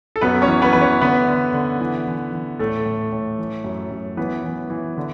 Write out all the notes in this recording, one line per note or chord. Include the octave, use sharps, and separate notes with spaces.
A4
F#2 B3 B4
C#4 C#5
E3
B3 B4
E3 B4
C#4 C#5
D3 B3 B4
D3
D3
E3
E3
E3
A2 A3 A4
A2
A2
E3
F#2
F#2
E3 B3 B4
E3
E3
D3